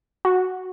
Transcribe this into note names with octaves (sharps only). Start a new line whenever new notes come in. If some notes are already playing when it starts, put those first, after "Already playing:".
F#4